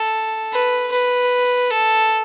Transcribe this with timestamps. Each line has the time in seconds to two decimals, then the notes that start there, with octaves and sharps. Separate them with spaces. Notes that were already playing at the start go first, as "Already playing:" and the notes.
Already playing: A4
0.53 B4
0.92 B4
1.71 A4